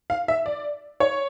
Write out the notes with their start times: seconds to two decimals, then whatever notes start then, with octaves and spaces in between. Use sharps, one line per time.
0.10 F5
0.28 E5
0.46 D5
1.00 C#5